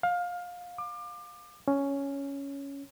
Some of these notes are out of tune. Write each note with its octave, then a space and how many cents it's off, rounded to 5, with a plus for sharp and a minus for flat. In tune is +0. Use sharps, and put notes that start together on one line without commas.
F5 +20
D6 +30
C#4 +5